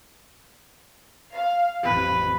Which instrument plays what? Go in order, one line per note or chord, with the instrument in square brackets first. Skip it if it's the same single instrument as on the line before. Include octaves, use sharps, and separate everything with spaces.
[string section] F5
[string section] A1 F2 [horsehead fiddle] B4